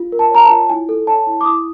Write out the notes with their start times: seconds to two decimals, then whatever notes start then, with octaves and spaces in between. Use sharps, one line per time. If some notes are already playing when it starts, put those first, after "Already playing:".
Already playing: F4
0.12 A#4
0.19 A5
0.31 C#5 A#5
0.44 A5
0.50 F4
0.69 E4 G#5
0.89 A4
1.07 C#5 A5
1.27 E4
1.41 D6
1.45 E4 D#6